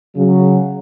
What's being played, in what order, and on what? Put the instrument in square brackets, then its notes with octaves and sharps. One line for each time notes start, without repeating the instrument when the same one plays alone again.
[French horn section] C#3 F#3